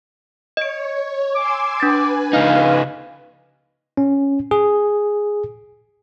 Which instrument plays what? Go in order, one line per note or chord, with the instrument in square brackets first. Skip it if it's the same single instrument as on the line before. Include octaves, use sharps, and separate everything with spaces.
[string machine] C#5 [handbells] D#5 D7
[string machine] G#5 C6 E6 [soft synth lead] D6
[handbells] D4 A6 [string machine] B4 G#5
[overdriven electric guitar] C#2 D#4 [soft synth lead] F5
[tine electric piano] C#4
G#4